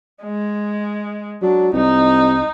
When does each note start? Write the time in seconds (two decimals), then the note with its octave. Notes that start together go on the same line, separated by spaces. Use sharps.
0.23 G#3
1.42 F#3 D4
1.73 C2 D#4